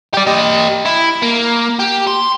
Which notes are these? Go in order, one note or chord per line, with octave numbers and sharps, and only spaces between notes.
G4 D5
G4 D#5
E4
A#3
G4
C6